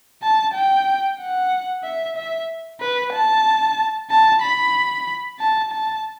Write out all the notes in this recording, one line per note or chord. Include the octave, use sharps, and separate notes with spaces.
A5
G5
F#5
E5
E5
B4
A5
A5
B5
A5
A5